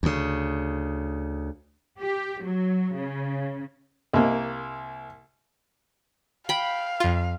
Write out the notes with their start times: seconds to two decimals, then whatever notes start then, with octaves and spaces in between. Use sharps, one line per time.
0.03 D2 C#3
2.00 G4
2.42 F#3
2.95 C#3
4.14 C2 A#3
6.49 F5 G5 B5
7.00 F2 F4